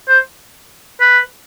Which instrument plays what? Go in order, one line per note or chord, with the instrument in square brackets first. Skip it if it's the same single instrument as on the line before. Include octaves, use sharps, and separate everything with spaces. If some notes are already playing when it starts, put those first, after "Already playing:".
[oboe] C5
B4